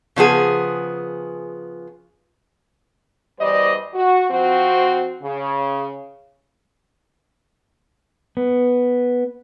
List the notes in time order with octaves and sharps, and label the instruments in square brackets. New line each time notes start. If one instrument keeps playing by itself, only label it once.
[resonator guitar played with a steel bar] C#3 F3 B3 G#4
[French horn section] E2 E3 G3 C5 D5 D#5
F#4
F3 C4 F#4
C#3
[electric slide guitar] B3